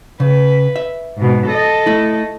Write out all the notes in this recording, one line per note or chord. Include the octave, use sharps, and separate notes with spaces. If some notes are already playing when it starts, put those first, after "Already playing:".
C#3 B4
E5
G#2 B2
A4 D#5
A3 E4